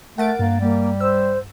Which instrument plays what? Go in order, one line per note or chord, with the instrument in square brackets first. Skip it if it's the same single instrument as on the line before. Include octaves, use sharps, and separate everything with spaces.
[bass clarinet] A3 [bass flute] A#4 [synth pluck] F#5 A6 D7
[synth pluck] G2 [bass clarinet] A#3
[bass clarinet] G3 [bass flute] A#3
[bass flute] C5 [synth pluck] E6